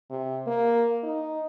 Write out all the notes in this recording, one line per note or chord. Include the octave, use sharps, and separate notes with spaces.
C3
A#3
D#4